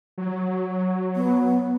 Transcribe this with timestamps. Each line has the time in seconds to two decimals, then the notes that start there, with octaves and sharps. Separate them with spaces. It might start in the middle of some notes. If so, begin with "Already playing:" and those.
0.18 F#3
1.16 B3